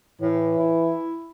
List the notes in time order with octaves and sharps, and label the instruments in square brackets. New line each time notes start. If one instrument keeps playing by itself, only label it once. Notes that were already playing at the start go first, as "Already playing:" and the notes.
[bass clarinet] A2 [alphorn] E3
[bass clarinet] E4